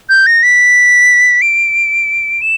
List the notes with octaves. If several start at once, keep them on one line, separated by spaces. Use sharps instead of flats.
G6
A#6
B6
D7
E7